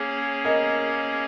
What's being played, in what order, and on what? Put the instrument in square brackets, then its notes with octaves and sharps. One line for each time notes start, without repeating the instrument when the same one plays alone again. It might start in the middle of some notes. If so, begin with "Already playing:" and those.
Already playing: [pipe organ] A#3 C#4 G#4 C#5
[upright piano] A#4 D#5